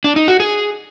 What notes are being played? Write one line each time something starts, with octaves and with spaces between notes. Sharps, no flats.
D4
D#4
F#4
G#4